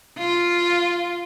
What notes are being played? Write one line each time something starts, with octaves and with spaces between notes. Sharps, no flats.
F4